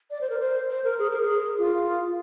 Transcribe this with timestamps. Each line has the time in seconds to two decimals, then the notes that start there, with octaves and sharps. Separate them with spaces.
0.10 D5
0.21 C5
0.30 A#4
0.40 C5
0.70 C5
0.84 A#4
0.99 G#4
1.10 A#4
1.22 G#4
1.58 F4